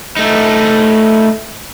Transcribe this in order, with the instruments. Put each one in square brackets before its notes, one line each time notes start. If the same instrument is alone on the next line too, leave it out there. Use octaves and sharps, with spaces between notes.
[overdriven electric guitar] A3 D#4